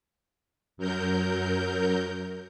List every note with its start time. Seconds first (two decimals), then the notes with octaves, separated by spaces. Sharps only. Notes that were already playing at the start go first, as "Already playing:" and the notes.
0.77 F#2 F#3 A#4 G6